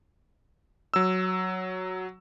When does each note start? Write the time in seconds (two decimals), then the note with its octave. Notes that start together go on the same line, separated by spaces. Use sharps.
0.94 F#3 E6